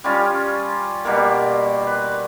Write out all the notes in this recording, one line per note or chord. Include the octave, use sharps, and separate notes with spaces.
G3 C#4 F4
B2 G3 A#3
B4